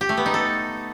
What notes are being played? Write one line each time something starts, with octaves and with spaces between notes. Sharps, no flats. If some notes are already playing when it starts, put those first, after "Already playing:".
G4
A3
B3
D#4
A4